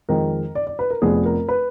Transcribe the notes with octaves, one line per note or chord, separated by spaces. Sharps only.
F2 D#3 G#3 A#4
D5
D5
B4
A#4
F1 F2 F3 B3 D4 G#4
A#4
B4